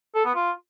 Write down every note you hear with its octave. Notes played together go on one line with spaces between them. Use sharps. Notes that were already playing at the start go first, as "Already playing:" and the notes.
A4
B3
F4